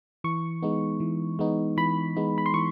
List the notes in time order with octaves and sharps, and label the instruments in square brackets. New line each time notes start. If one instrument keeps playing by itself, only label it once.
[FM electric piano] E3 C#6
G#3 B3 D#4
E3
G#3 B3 D#4
E3 B5
G#3 B3 D#4
B5
C6
E3 C#6